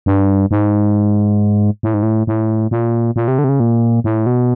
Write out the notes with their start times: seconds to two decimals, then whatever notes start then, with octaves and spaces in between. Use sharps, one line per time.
0.06 G2
0.51 G#2
1.83 A2
1.94 G#2
2.03 A2
2.27 A2
2.71 A#2
3.16 A#2
3.28 C3
3.39 D3
3.44 C3
3.49 C#3
3.60 A#2
4.04 A2
4.26 B2